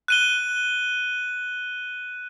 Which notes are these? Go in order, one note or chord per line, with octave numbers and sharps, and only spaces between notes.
F#6 D#7 G7